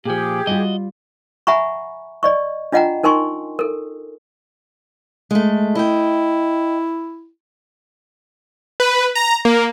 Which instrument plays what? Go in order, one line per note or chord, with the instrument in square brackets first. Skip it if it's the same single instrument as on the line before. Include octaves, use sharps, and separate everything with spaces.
[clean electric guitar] A#2 F3 [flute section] G4 G#4
[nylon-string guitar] G3 F4 [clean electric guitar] F#4 D#5
[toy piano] E5 F#5 G#5 A#5 B5 C#6
D5 D#5 C#6
D4 F4 D#5 F#5 G5 A#5
D#4 A#4 G#5 C6 C#6
A4 A#4
[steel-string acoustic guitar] G#3 A3
[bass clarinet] E4 [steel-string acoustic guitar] D#5 G5
[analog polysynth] B4
A#5
A#3